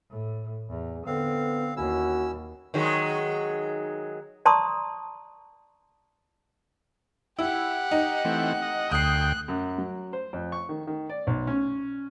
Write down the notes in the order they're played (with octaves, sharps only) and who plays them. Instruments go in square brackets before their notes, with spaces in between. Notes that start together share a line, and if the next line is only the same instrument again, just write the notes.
[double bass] A2
E2
[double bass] D3 [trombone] B3 [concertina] C4 F5
[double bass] D#2 [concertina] C#4 E4 E6 [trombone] F#4
[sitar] D#3 F#3 G#3
[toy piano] D5 A5 A#5 C6 C#6 D#6
[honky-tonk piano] E4 [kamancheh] G4 F#5
[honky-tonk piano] D#4
[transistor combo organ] E3 A3 C4
D#5
[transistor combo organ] D2 G5 [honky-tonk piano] D#6 C7 [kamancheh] F#6
[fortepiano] F#2
F#3
C5
F2
C#6
D#3
D#3
D5
B1
C#4